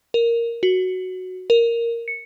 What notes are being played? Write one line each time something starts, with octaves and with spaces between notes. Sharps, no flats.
A#4
F#4
A#4
C#7